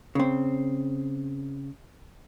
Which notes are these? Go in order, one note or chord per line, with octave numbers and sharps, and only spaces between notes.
C#3 C4